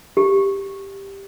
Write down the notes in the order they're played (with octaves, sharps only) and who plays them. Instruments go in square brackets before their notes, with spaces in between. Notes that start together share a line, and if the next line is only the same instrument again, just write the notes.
[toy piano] G4